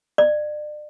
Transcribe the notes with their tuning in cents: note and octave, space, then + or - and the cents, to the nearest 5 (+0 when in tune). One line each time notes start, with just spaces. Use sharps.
D5 +35